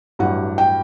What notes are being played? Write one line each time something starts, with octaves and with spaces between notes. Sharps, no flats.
A1 G2 F#3 F#5
G5